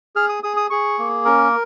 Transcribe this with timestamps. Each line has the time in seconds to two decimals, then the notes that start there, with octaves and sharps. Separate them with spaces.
0.16 G#4 F6
0.29 D#6
0.43 G#4 D#6
0.57 D#6
0.70 G#4 C#6
0.99 A#3
1.25 C#4 A#4